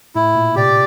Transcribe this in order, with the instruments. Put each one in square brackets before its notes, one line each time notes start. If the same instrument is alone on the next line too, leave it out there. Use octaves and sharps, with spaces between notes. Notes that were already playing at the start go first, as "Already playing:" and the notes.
[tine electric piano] A2 [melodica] E4
[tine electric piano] A#2
[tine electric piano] C3 [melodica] G4 D5